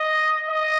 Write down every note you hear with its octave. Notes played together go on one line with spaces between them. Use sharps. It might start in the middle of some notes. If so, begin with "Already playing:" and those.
Already playing: D#5
D#5